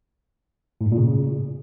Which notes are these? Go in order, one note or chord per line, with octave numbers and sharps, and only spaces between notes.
A2
G#2
A#2
C#3